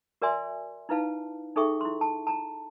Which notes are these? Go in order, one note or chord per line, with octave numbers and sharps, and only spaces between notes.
F#4 A#4 D5 E5 G#5 C6
D#4 E4 B4 F5 A5
D#4 G#4 A4 E5 G5 C#6
E4 C6
A5
A5 A#5